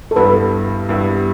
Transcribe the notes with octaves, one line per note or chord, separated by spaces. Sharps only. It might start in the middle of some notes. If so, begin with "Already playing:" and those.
A4
G2 G3 B3 E4 B4
G2 G3 B3 E4